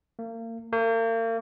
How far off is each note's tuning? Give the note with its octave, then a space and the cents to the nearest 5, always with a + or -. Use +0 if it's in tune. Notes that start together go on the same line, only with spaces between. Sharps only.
A#3 -35
A#3 -40